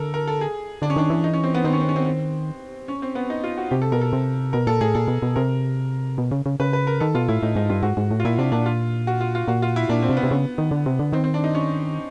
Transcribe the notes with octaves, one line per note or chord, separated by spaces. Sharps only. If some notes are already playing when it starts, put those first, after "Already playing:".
Already playing: D3 A4 A#4
A#4
A4
G#4
D3 D4
C#4
D#3 D4
E3
D#4
C#4
C4
B3
D#3 C4
C#4
C4
C#4
C4
C4
C#4
C4
B3
D#4
F4
F#4
C3 G4
A4
B2 A#4
A4
C3
B2 A#4
A#2 A4
A2 G#4
A#2 A4
B2
B2
C3 A#4
B2
C#3
C#3
C#3 B4
B4
A#4
D#3 A4
B2 F4
A2 E4
A2 D#4
G#2 D#4
G2 F4
G#2 F#4
G#2
A2
F4
A#2 E4
C3 D4
A#2 D4
F4
F#4
F4
F4
A#2 F#4
F4
E4
A#2 D4
C4
C3
B3
C3
C#3
D#3
D3
C3
D3
D#3 C4
C4
D4
D#4
C#4